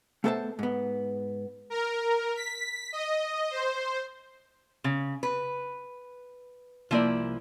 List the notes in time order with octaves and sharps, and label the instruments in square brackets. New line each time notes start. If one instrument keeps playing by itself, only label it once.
[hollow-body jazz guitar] A3 B3 A4 C5 E5 A5
G#2 B3
[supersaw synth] A#4
B6
D#5
C5
[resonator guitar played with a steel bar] C#3
B4
[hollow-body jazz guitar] C2 A#3 D5 [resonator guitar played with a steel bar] F3 E4